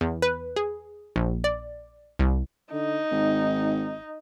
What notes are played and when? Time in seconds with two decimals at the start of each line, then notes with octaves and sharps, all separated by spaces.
0.01 E2
0.22 B4
0.56 G#4
1.16 A#1
1.44 D5
2.19 C2
2.72 D3 D#4
3.11 G#1